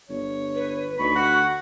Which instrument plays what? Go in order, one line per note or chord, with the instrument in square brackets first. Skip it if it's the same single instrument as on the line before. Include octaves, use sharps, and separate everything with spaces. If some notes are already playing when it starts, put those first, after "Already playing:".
[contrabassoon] G1 [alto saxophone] C#5
[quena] B4
[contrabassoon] D2 [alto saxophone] D#4 [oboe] B5 [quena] C#6
[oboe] F#4 [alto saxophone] F#5